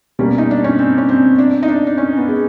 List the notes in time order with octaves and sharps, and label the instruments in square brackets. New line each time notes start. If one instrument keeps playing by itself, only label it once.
[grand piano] B2 G3 A#3 [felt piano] C#4
[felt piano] D#4
D4
C#4
C4
C#4
C4
D4
D#4
D4
D4
C#4
B3
G#3